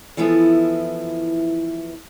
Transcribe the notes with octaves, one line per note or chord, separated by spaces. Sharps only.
E3 F3 B3 E4 A4